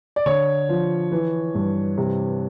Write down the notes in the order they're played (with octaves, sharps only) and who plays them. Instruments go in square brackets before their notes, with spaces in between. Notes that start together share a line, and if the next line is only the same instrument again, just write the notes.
[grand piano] D5
D3 C#5
F3
E3
G2
C3